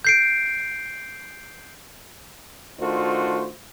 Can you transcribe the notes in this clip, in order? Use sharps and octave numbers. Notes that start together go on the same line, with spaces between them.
G6 C7 D7
D#3 A3 D4 F4 F#4 C5